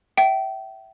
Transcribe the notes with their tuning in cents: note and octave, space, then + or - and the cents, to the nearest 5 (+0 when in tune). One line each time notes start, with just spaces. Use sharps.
E5 +0 G5 -30